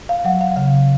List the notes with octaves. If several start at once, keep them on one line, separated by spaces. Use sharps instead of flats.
F5
F#3 F#5
F5
C#3 F5